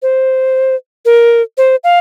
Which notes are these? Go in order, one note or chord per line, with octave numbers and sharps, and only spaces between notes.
C5
A#4
C5
F5